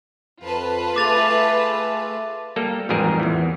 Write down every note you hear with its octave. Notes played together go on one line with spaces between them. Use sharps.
F2 F4 B4 A5
A3 G#4 D6 A6 F7
G3 A#3 A4
A1 F2 G#2 G3 G#4 A#4
E2 E3